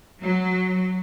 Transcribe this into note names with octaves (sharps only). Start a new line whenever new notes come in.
F#3